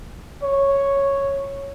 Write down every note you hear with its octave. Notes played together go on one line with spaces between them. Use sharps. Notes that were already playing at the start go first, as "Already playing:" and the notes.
C#5